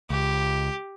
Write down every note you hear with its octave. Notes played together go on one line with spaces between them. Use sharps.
C#2 G4